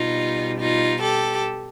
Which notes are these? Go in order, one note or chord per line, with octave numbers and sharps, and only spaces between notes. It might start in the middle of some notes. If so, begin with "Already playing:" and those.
Already playing: B2 G3 D#4 F4
D#4 F4
G4 A4